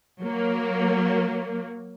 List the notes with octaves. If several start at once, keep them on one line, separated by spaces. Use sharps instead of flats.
F#3 A#3